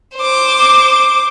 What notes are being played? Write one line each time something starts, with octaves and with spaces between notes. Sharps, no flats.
C5 D6